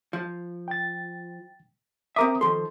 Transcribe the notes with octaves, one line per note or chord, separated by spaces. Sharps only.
F3
G5 A6
C4 A#4 E5 A#5 D6 D#6
D#3 F3 A4 C6